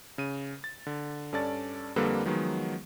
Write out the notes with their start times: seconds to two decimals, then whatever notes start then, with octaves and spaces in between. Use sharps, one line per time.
0.18 C#3 D#7
0.64 A6
0.87 D3
1.32 G2 C#4 A4 D5 A5 A6
1.96 F2 D3 G3 A#3 A4 B4
2.26 D#3 F3 F#3 G#3 B3